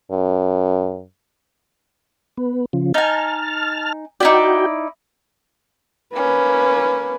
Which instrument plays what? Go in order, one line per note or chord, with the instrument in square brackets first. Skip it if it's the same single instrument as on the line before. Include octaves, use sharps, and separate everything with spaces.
[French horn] F#2
[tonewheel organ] B3
C#3 F3
[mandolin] D#4 G#5 [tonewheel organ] A5 F6
[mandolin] D#4 E4 D5 [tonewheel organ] F#4 G5
[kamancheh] A#3 C#4 [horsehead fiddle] B4